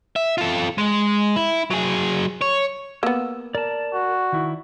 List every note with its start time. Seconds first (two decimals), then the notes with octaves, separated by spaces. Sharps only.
0.16 E5
0.38 F4 A4
0.78 G#3
1.36 E4
1.70 F#3 G#4
2.41 C#5
3.03 A#3 B3 E6
3.55 A#4 D5 A5
3.94 F#4
4.32 D#3 E4